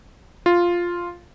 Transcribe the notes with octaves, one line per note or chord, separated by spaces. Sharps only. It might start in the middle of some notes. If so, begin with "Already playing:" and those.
F4